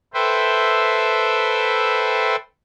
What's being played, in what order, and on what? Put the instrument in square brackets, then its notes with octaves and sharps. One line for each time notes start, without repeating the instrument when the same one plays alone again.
[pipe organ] A4 B4 C5 E5 G5